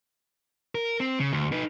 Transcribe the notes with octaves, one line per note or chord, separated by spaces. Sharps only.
A#4
C4
C#3
D2
D#4 B4